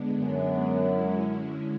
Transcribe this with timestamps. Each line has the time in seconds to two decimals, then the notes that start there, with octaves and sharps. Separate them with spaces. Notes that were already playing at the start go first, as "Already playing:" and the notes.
Already playing: D3 G#3 B3 D4
0.20 F#2
0.87 D3 G#3 C#4 E4